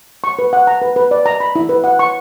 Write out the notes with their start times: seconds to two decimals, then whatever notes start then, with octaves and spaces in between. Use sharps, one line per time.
0.24 C#6
0.39 B4
0.53 F#5
0.67 A#5
0.82 B4
0.96 B4
1.11 D5
1.26 A#5
1.40 B5
1.55 E4
1.69 B4
1.84 F#5
1.99 C#6